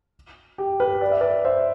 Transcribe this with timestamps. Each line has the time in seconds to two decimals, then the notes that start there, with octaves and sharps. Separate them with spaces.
0.58 G4
0.80 G4 B4
1.01 D5
1.11 E5
1.21 B4 D5
1.44 C5 E5